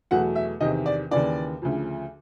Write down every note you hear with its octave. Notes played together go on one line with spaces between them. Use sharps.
E2 B2 F#3 A3 F#5
E5
E2 C3 D#3 D#5
D5
D#2 C#3 E3 D5
D2 C#3 F3